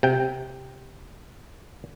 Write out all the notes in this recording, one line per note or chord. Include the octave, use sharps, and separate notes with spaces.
C3 G5